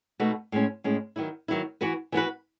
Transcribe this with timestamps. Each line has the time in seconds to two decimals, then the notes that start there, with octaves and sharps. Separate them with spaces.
0.20 B2 A3 D#4 F#4 B4
0.52 A2 G#3 C#4
0.84 A2 G#3 C#4
1.16 D#3 F#3 B3 E4
1.48 D#3 F#3 B3 E4
1.81 E3 B3 F#4 B4
2.12 E3 B3 F#4 B4